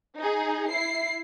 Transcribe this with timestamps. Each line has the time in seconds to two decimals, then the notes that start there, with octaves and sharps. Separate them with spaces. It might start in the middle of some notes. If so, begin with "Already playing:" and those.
0.18 D#4 G#4
0.69 E4 C7